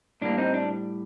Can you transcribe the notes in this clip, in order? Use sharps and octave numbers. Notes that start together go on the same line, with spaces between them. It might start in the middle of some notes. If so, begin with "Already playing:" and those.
A2 G3 A#3 D4
C4 D#4
D4